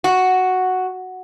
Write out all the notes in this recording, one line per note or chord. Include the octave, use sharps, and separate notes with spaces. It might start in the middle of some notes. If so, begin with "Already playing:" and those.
F#4